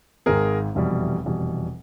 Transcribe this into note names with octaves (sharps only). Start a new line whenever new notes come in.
G#1 G#2 D#3 G#4 A#4
F1 E2 B2 G3
F1 E2 B2 G3